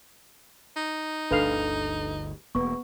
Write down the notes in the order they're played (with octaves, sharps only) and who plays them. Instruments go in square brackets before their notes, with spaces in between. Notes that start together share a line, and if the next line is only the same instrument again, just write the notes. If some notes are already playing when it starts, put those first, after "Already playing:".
[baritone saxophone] D#4
[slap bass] G1 D2 [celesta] D4 A4 F7 [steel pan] B4 F5
[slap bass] E1 A#3 [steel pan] B3 [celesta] C#6